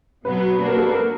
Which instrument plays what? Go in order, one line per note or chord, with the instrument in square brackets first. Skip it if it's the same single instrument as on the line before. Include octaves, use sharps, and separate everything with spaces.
[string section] B2 F#3 B3 [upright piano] B4
[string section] A#3 D4 F#4 [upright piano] B4
[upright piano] A#4
A4
B4
A#4